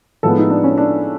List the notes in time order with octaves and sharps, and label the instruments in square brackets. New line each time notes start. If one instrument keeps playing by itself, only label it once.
[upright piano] A2 F3 G#3 B3 A4
D#4
D4
C#4
D4